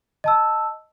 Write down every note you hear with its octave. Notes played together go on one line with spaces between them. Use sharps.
D#5 A5 E6